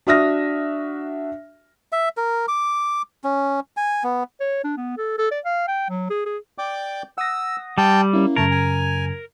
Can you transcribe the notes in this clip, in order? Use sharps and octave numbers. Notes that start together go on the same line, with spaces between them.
D4 F#4 E5 D#6 F6 A#6
E5
A#4
D6
C#4
G#5
B3
C#5
D4
B3
A4
A4
D5
F5
G5
F#3
G#4
G#4
D5 G5 D6
F#5 D#6 E6 A#6
G3 G5 A5
A#3 C#4 E4
F#2 C#3 A3 A#4 A5 G#6
G#5